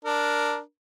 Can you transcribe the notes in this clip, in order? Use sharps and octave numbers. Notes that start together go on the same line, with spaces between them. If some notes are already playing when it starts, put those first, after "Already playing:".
D4 A#4